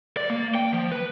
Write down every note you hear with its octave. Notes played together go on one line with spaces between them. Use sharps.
D5
A#3
G5
F3
B4